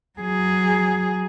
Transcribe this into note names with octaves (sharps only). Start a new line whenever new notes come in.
F#3 G#4